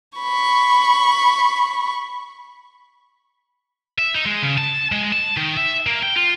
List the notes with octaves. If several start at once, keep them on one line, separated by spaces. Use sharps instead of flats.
B5 C#6
E5
D#4
G#3
C#3
A5
G#3
A5
D#3
E5
A#3
G5
F4